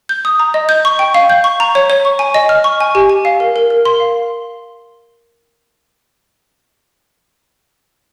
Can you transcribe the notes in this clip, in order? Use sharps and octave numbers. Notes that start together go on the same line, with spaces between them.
G6
D#6
A#5
D#5
G6
C#6
G5
F5
G6
C#6
A#5
C#5
C#5
C#6
G#5
D#5
F6
C#6
G#5
G4
G#5
F5
A#4
A#4
A#4
C6
F5